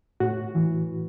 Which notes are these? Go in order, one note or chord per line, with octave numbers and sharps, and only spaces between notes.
A2 F#4
E3